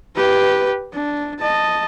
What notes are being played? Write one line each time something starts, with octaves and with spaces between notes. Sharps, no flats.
G4 B4
D4
D#5 A5